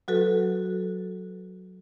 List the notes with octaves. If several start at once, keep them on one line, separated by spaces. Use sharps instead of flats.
F#3 F#4 A4 B4